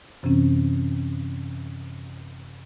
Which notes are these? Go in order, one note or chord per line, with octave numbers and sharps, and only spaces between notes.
F#2 C3 E3 C4 C#4